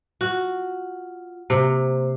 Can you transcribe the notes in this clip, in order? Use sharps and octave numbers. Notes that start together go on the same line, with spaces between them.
F4 F#4
C3 A#3 C5